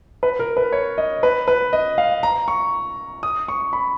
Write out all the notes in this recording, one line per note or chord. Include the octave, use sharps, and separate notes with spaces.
B4
A#4
B4
C#5
D#5
B4
B4
D#5
F5
A#5
C#6
D#6
C#6
B5